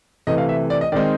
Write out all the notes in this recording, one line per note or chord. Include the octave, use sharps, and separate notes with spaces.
C3 E3 A3 D#5
F5
E5
D5
D#5
D#3 G#3 C4 D#4 D5